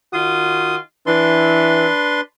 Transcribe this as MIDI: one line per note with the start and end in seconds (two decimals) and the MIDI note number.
0.13 0.77 51
0.13 0.77 65
0.13 0.77 66
0.13 0.76 87
1.06 1.87 52
1.06 2.21 62
1.06 2.21 71
1.06 2.21 84